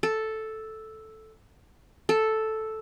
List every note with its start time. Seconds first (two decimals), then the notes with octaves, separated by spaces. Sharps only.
0.03 A4
2.09 A4